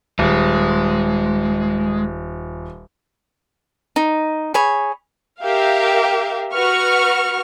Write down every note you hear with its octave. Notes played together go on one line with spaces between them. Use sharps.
D#1 G#3
D#4
G#4 C#5 B5
G4 A#4 E5 F5
F#4 B4 C#6 F6